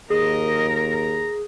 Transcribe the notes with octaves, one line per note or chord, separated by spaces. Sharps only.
D#2 G#4 A#4 D#5
A#5